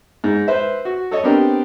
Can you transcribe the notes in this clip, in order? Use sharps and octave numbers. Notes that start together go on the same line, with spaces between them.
G#2
B4 C5 E5
F#4
A4 C#5 D#5
B3 C4 D4 G4 A#4